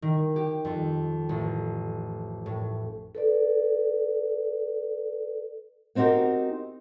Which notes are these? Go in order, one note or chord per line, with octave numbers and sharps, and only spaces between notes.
D#3
G4
F2
A1
A2
A4 B4 D5
B3 C4 D#4 F#4 G4 A#4